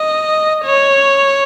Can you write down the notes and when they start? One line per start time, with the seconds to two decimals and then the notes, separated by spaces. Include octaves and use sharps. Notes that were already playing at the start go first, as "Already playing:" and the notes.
Already playing: D#5
0.64 C#5